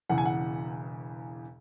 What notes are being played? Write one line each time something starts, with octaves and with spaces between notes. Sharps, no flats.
E1 E2 C#3 E3 F#5
G#5
F#5